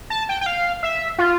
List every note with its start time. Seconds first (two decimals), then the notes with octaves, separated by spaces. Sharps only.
0.10 A5
0.29 G5
0.41 G5
0.46 F5
0.83 E5
1.18 F4